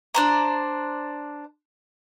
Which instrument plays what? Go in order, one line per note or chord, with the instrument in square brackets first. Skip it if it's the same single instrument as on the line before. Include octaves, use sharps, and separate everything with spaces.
[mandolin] D4 C5 A#5